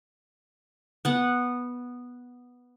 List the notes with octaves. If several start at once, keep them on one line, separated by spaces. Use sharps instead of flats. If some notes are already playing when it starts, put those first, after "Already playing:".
B3 F#5